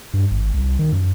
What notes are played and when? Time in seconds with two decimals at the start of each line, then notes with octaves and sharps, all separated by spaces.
0.14 G2
0.31 G#1
0.54 C2
0.79 D#3
0.92 F#2